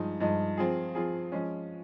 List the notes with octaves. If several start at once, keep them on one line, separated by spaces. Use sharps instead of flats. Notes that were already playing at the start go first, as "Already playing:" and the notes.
Already playing: G2 F3 G#3 D#4
G2 F3 G#3 D#4
F3 C4 F4 G#4
F3 C4 F4 G#4
F3 G#3 C#4